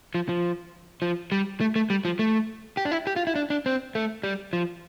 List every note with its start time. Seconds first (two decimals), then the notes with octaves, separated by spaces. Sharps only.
0.15 F3
0.29 F3
1.02 F3
1.32 G3
1.61 A3
1.76 A3
1.90 G3
2.05 F3
2.19 A3
2.77 G4
2.85 D4
2.91 E4
3.07 G4
3.16 F4
3.27 E4
3.35 D4
3.50 D4
3.66 C4
3.95 A3
4.23 G3
4.53 F3